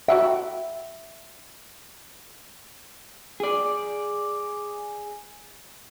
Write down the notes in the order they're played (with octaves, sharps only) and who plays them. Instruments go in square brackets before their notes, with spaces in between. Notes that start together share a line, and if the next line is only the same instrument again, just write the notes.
[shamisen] F#4 F#5 G5 [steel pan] E5
[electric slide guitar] G#4 D5